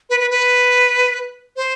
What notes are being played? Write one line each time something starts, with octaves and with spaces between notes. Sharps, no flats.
B4
B4
B4
C5